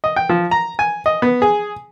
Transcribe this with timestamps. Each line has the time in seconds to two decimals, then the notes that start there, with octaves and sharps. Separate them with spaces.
0.04 D#5
0.16 G5
0.29 F3
0.51 A#5
0.79 G#5
1.06 D#5
1.22 B3
1.42 G#4